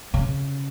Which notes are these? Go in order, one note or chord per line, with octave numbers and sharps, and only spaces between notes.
C#3